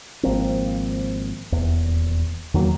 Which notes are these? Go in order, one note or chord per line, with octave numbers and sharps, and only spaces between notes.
G#1 F3 A#3 C4
D#1 E2
E2 D#3 F#3 A#3